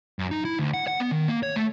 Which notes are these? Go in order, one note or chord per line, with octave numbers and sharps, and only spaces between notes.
F#2
D#4
E4
D2
F#5
F#5
B3
D#3
A#3
C#5
A3